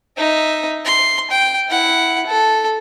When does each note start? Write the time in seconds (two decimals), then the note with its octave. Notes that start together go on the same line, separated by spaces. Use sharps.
0.18 D#4 E5
0.85 C6
1.31 G5
1.68 E4 F#5
2.26 A4